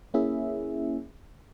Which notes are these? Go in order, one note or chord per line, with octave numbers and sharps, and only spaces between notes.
A#3 C#4 E4 G#4 E5